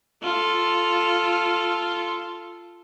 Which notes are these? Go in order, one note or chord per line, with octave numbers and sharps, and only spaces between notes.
F4 A4